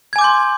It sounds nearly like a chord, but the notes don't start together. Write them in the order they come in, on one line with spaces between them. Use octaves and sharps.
G#6 G#5 D6 G6 C6